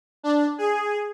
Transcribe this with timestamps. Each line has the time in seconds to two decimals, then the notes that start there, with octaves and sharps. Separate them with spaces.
0.24 D4
0.58 G#4